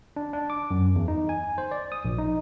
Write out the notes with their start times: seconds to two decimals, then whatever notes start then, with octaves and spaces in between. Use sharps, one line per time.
0.16 D4
0.33 D4
0.50 D6
0.71 F#2
0.95 E2
1.08 D#4
1.29 G#5
1.58 C5
1.71 D5
1.92 D#6
2.05 A#1
2.19 D#4